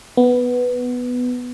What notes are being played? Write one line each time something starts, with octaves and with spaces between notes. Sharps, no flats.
B3